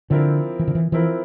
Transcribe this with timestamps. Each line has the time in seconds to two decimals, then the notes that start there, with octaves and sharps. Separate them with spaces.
0.10 D3 F3 C4 E4 A#4
0.59 E3
0.68 D3
0.75 E3
0.92 E3 F3 C4 E4 A#4